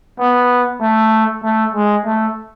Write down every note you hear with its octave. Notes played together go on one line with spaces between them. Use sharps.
B3
A3
A3
G#3
A3